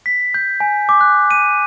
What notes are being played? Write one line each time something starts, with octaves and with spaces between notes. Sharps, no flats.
B6
G6
G#5
D6
F#6
D#7